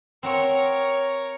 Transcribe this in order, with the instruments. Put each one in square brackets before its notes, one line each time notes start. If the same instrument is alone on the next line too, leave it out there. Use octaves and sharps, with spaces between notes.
[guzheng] C4 F#4 [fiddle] A#4 C#5